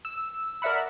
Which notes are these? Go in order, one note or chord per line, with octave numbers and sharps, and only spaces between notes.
E6
A#4 D5 E5 F#5 B5